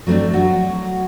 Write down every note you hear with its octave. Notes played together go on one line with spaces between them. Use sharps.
F#3 A3 A#3 C4 D4
F#3 F#4